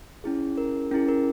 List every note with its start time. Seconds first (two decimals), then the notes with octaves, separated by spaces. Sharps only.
0.24 C#4 E4 G#4
0.58 A#4
0.91 C#4 E4 G#4 A#4
1.09 A#4